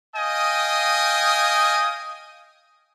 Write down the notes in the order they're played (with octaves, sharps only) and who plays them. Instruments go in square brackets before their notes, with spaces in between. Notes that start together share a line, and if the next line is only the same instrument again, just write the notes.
[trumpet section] D#5 F5 G5 G#5 D#6